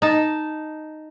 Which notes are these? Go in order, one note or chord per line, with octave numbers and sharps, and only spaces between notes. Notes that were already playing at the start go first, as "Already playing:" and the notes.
D#4 A5